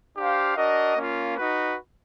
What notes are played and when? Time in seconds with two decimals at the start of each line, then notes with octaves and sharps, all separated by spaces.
0.17 D4 G4 C5 F5
0.56 D4 F#4 A#4 D#5
0.96 A#3 C#4 F4
1.35 D#4 F#4 B4